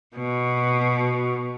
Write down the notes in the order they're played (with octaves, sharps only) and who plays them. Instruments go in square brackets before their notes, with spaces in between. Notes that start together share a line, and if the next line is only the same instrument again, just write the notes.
[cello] B2